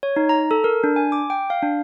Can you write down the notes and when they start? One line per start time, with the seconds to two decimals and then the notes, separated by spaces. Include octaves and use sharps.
0.03 C#5
0.16 D#4
0.29 A#5
0.51 A4
0.64 A#4
0.84 D4
0.96 G#5
1.12 D6
1.30 G5
1.50 F5
1.62 D4